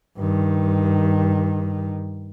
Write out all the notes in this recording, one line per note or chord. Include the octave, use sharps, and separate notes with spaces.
G2 D#3